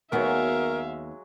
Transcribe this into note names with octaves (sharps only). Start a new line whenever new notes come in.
D#2 F#3 G#3 B3 A#4 E5 F5